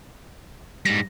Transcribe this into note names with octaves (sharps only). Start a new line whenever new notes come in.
G#2 G3 A#6